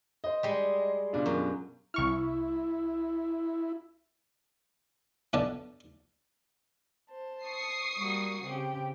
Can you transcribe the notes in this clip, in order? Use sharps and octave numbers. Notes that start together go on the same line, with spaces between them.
C5 D#5
G3 G#3
B2 D4 F4
F#2
C2 E4 C#6 F6
F#2 B2 D3 D5 A5
C5 A5
C#6 D#6 C7
G3 A#3 F#4
C#3 C4 G4